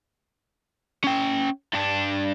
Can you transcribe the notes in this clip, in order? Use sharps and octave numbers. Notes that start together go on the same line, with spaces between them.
C#4 G5
G2 D4